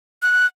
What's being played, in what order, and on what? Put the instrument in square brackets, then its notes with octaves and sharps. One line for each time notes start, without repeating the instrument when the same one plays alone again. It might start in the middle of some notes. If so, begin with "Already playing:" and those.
[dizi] F#6